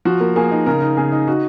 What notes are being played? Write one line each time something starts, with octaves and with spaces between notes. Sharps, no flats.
F3 F#4
A#3
A#3 G#4
D#4
C#3 A#4
D#4
C#3 G#4
D#4
D#4 F#4